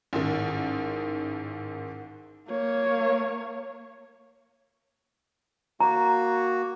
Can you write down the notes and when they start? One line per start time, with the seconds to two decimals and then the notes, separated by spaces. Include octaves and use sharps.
0.13 A1 G#2 D#3
2.48 A#3 C#5
5.80 A#3 F#4 A#5